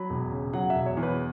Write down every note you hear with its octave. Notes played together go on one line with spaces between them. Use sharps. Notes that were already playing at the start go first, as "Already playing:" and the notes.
Already playing: F#3 B5
E1
C#3
F#3 F#5
E1 E5
C#5
E2
B4